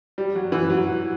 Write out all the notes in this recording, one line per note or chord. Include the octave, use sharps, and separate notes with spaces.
G3
F#3
E3
F#3